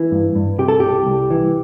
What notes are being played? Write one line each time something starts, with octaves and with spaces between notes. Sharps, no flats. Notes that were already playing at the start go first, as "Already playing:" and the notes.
Already playing: E3
G2
G2
C3 G4
A4
C2 G4
C2
E3